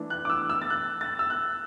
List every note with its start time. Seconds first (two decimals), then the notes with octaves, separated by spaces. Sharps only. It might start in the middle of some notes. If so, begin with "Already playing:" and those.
Already playing: E3 A3 D4
0.10 F#6
0.25 D6
0.30 E6
0.50 E6
0.62 A6
0.70 F#6
1.01 A6
1.19 E6
1.30 F#6